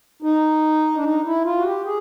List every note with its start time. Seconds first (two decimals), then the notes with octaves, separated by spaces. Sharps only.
0.22 D#4
0.96 D4
1.03 D#4
1.25 E4
1.45 F4
1.58 F#4
1.64 G4
1.85 G#4